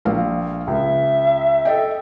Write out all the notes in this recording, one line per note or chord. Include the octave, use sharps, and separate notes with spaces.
A#1 F5
C#2 E5
A4 D#5 G5